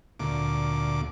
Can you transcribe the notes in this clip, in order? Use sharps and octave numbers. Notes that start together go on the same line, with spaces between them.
D2 A#2 D6